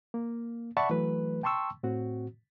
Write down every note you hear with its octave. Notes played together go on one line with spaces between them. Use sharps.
A#3
D5 E5 F#5 A5 B5 C#6
E3 F#3 A3 B4
G5 A5 C6 C#6 E6
A2 C4 F#4